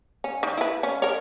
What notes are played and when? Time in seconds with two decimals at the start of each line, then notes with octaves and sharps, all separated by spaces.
0.24 C#4
0.43 D#3
0.57 E4 B4
0.83 C#4
1.02 A#4 C#5